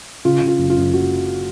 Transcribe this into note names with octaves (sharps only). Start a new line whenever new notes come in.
C#3 F4
C#3
F4
F#1
F4
F#2
F#1 F#4